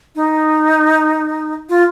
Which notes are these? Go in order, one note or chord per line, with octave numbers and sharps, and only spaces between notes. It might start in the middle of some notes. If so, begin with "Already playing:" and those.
D#4
F4